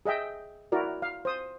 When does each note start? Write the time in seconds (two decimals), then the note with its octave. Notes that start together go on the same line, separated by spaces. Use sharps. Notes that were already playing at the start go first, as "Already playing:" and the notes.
0.06 G#4 D#5 E5 G5
0.72 E4 F#4 A#4 D5
1.02 F5
1.25 C5 D#6